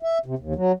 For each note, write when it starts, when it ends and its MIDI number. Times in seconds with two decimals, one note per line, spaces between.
0.03 0.18 76
0.26 0.35 48
0.39 0.54 39
0.55 0.72 54